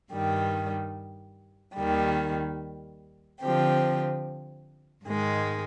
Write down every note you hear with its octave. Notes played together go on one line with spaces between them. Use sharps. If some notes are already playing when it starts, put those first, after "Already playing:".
G2 D#3 G3
D#2 D#3 G3
D3 F3 C4 G4
G#2 D#3 G#3